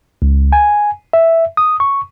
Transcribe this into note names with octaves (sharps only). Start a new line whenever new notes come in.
C#2
G#5
E5
D#6
C#6